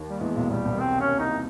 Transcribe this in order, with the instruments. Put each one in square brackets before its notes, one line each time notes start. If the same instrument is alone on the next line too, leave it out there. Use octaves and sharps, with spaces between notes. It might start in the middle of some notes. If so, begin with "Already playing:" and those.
Already playing: [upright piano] D#2 D#3
[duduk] G3
[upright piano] E2 E3 [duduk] G#3
[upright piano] B1 B2
[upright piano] B1 B2 [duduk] G3
[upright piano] C2 C3
[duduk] C4
C#4
D#4